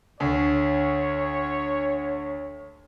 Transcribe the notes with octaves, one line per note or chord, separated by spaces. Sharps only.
D2 C#5